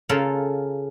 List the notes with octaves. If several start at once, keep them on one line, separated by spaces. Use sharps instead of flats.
C#3 F4 A4 A#4